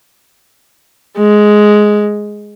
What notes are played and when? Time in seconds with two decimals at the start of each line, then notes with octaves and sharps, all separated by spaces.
1.18 G#3